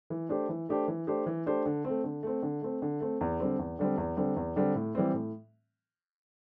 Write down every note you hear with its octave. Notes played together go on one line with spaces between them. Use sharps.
E3
A3 D4 G4 C5
E3
A3 D4 G4 C5
E3
A3 D4 G4 C5
E3
A3 D4 G4 C5
D3
A3 C4
D3
A3 C4
D3
A3 C4
D3
A3 C4
E2
D3 G3 C4
E2
D3 G3 C4
E2
D3 G3 C4
E2
D3 G3 C4
A2
E3 G3 C4
A2